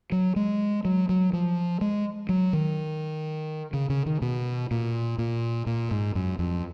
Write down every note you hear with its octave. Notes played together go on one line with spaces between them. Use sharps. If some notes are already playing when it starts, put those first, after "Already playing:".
F#3
G#3
F#3
F#3
F3
G#3
F#3
D#3
C#3
C#3
D#3
B2
A#2
A#2
A#2
G#2
F#2
F2